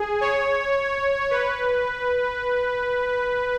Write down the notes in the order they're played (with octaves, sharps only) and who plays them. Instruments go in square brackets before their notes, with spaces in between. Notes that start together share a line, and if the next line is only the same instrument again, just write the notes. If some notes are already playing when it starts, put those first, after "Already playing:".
Already playing: [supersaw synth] G#4
C#5
B4